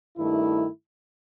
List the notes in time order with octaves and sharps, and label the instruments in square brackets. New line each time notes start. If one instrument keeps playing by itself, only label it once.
[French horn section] G2 D#3 A3 E4